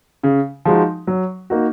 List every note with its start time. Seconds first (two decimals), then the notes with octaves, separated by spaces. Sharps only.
0.23 C#3
0.65 F3 G#3 D#4 F#4
1.07 F#3
1.50 A#3 D#4 F#4